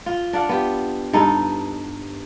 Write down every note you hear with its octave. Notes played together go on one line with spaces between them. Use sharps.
F4
D4 D5 F5 F#5
B3 F4 G4
G2 D#4 A4